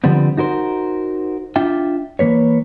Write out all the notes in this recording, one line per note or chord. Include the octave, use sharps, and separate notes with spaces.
D3 F3 G3 B3 C4
D#4 F#4 A#4 C5
D4 F4 E5 G5
E3 A#3 B4 C#5